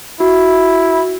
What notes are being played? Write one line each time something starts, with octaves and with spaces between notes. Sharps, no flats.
E4 F#4